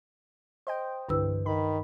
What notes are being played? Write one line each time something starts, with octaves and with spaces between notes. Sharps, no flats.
C5 D#5 G5
C2 G2 D3 E3 B4 E6
D#3 B5